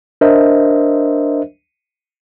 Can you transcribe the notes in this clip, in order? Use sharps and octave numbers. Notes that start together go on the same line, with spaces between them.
D4 A#4 C5 D#5 E5